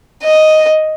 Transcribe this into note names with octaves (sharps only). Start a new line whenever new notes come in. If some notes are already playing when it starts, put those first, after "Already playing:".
D#5